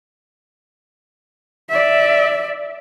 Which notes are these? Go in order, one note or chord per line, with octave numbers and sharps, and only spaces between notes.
D5 E5